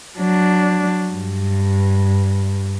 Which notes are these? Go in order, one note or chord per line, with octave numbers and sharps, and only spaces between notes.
F#3 D4
G2